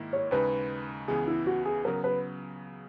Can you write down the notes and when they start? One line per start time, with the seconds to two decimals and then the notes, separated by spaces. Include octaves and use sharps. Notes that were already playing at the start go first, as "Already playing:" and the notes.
Already playing: G#2 D#3 A#3 E4
0.13 C#5
0.31 D#2 C#3 G#3 D#4 B4
1.08 C#2 C#3 E3 B3 G#4
1.27 E4
1.46 F#4
1.65 G#4
1.85 C#3 F#3 B3 A#4
2.04 B4